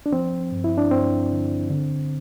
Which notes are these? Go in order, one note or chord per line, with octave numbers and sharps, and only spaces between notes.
D4
F3 C4
G2
E4
D4
G2 C4
D3
D3